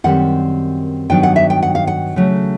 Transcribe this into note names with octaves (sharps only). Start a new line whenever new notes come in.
F#2 D#3 G3 C4 F#5
G2 D#3 F#3 B3 D4 G5
F#5
E5
G5
F#5
F5
F#5
C#3 F#3 A3